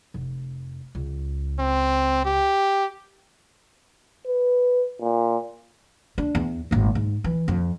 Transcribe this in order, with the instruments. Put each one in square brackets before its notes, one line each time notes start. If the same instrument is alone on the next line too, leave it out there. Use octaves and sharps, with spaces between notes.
[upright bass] F1
C#2
[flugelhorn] C4
G4
[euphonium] B4
A#2
[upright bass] D4
E2
D#1 G#1
G#2
E3
F2